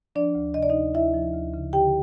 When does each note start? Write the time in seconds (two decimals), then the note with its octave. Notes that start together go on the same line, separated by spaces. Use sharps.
0.15 F3 D4 D5
0.35 D2
0.54 C3 D#5
0.63 D5
0.69 D#4 D#5
0.75 D2
0.95 D2 E4 E5
1.14 F3
1.34 D2
1.54 C#3
1.73 D3 G4 G5